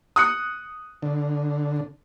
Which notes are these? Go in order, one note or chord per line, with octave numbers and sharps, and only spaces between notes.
D#6 F#6 C#7
D3